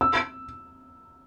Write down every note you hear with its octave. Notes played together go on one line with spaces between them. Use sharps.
E6